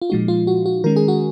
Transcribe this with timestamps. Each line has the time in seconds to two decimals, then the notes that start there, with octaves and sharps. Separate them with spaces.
0.02 F4
0.10 A#2 F3 G#3 D#4 F#4
0.28 F4
0.47 F#4
0.66 F#4
0.84 D#3 G#3 C#4 A#4
0.96 G#4
1.08 F#4